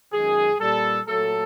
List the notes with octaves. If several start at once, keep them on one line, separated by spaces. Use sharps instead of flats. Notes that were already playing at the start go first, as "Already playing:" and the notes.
F#2 D#3 G#3 G#4
A#2 G3 A4
A#2 F#3 A3 A4